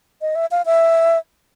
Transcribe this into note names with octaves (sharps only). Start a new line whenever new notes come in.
D#5
E5
F5
E5